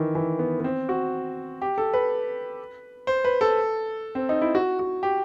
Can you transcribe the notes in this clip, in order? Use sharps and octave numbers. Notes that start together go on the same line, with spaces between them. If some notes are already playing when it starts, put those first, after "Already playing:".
Already playing: D#3 E3
E3
B3
B3
C4
F#4
G4
A4
B4
C5
B4
A4
C4
D#4
E4
F#4
F#4
G4